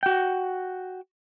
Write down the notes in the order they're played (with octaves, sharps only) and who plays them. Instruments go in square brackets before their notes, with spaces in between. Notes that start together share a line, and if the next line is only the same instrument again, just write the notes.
[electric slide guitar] F#4 G5